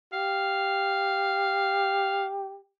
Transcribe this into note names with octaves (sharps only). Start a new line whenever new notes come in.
G4 F5